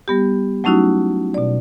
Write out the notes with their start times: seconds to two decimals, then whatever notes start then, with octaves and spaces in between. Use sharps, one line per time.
0.08 G3 B3 G4
0.64 F#3 A3 C#4 D#4 E4 F#4
1.34 B2 D5